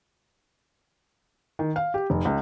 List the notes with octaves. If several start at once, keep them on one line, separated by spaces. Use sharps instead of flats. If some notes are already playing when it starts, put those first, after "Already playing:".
D#3
F5
G4
F1
C#2